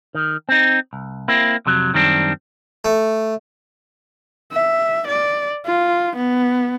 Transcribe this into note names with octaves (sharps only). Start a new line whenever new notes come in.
D#3
C4 D#4
C2
A#3 C4 E4
F2 C3 F#3
F#2 D#3 G3 C4 D4
A3
E5
D5
F4
B3